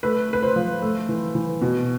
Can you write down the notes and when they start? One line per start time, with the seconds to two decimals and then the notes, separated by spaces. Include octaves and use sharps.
0.03 A3 B4
0.30 A3 B4
0.43 C5
0.56 F3
0.82 A3
1.09 E3
1.35 E3
1.62 B2